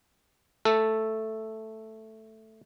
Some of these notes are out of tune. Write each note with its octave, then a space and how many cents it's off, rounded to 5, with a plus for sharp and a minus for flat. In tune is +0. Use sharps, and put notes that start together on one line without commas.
A3 +0 A4 +0